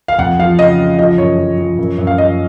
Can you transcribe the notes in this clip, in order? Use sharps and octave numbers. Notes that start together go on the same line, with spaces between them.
F5
F2 F#5
F3 F5
C#3 D#5
C#3
F3 D#5
F#2 C#5
F3
F3
F#2
F#2
F5
F3 D#5